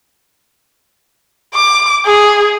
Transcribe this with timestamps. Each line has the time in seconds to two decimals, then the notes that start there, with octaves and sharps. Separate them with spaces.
1.54 D6
2.06 G#4